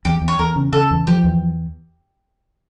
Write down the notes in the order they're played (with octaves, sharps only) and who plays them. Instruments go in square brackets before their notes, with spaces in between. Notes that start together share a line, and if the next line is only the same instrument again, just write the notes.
[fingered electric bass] E2 [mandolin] G4
[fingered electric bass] E2
[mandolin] C#5
[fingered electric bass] E2 [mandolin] A#4
[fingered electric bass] C#3
[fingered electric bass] C#3 [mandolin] A4
[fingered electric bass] E2
[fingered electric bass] F3 [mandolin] G4
[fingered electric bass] E2